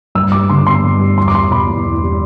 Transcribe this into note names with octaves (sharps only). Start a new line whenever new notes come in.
G2 E6
G3 D6
D3 C6
B3 C6
G2
G3
E2 C6
D6
G3 C6
B2 B5
E2
E2
G3